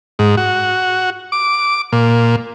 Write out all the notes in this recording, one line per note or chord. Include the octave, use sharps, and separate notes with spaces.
G#2
F#4
D6
A#2